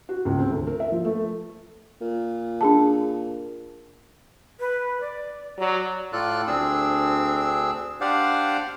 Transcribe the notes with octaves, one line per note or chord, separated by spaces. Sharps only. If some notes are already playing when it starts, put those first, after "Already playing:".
F#4
C#2
C4
D2
A#4
E5
F3
A3
A#2
D4 G#4 A5
B4
D5
F#3 D5
A2 F4 A4 D5 F#6
D2 C4 D4 G#4 E6
D4 G4 C5 D5 F5 F#5